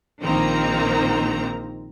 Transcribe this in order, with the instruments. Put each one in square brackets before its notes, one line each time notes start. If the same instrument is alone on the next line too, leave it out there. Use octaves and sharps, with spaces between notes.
[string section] A#1 D#3 A#3 C4 A#5